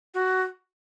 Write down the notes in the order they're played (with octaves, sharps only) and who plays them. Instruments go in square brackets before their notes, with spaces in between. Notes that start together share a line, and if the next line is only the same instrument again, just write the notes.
[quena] F#4